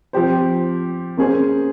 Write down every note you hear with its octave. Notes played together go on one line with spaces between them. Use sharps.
F3 C4 G4 C5
A#3 C#4 G#4 C5